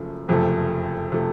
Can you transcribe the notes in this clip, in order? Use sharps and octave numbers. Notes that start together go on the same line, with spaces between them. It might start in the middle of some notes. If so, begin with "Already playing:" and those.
Already playing: F#1 F#2 F3 A3
F#1 F2 C3 F3 A3
C3 F3 A3